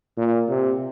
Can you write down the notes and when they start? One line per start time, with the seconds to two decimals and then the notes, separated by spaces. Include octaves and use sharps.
0.18 A#2
0.49 C3